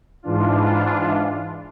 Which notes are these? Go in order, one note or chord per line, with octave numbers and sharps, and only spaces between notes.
G#2 E3 D4 F4